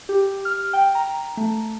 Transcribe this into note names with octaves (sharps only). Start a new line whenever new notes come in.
G4
F6
G5
A#5
A3